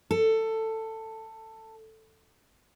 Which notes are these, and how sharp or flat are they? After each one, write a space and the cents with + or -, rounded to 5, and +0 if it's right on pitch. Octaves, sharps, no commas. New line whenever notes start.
A4 +15